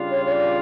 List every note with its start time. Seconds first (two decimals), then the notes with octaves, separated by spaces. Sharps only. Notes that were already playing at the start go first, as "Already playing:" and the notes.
Already playing: C#3 G3 D4 F4
0.11 C#5
0.26 C#5
0.32 D5